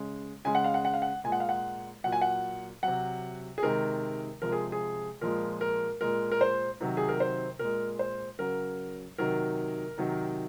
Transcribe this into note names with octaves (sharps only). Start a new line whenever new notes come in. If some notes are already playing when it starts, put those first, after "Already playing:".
Already playing: C#3 G#3
C#3 G#3 G#5
F#5
F5
F#5
F#5
F5
F#5
A#2 G#3 G#5
F#5
F5
F#5
A#2 F#3 F#5
G#5
F#5
C3 F#3 F#5
G#4
C3 D#3 G#3 A#4
C3 F3 G#3 A#4
G#4
G#4
A#2 F3 G#3 A#4
A#4
A#2 G#3 A#4
A#4
C5
C3 D#3 F#3
G#4
A#4
C5
A#2 G#3 A#4
C5
C#3 F#3 A#4
C3 D#3 F#3 A#4
C3 D#3 F#3